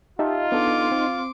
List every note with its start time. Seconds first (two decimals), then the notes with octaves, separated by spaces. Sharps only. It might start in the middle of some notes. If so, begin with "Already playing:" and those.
0.19 D#4 F4 G4 E5 A5
0.52 B3 D4 A4 C6 D6
0.92 C4